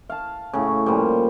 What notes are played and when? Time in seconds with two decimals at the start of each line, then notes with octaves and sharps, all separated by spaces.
0.10 F5 A5
0.53 A2 C#3
0.86 A#2 F3 G3